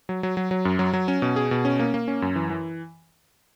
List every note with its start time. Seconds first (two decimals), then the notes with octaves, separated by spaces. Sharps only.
0.09 F#3
0.23 F#3
0.37 F#3
0.51 F#3
0.65 F#2
0.79 F#3
0.93 F#3
1.08 C#4
1.22 B2
1.36 G#4
1.51 B2
1.65 C#4
1.79 A#3
1.94 A#3
2.08 C#4
2.22 F#2
2.36 E3
2.50 E3